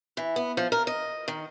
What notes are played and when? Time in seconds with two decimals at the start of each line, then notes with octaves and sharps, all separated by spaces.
0.17 E3
0.36 B3
0.57 F3
0.72 A#4
0.87 D#5
1.28 D#3